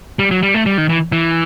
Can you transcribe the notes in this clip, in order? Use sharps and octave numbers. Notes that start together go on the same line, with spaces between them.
G3
F#3
G3
A3
G3
D#3
E3
E3